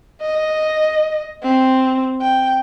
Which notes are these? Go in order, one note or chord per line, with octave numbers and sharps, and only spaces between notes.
D#5
C4
G5